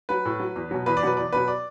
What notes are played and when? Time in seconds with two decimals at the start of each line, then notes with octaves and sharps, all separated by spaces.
0.09 F#3 B4
0.25 A2
0.40 F#3
0.56 E2
0.71 B2 F#3
0.86 E2 B4
0.97 D5
1.03 B2 F#3 B4
1.17 E2 D5
1.33 B2 F#3 B4
1.48 D5